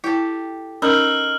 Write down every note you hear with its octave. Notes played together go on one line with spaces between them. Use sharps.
E4 G4 A4
C#4 D#4 A#4 E6 F6 F#7